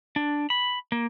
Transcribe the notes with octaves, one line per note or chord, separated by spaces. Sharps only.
D4
B5
A#3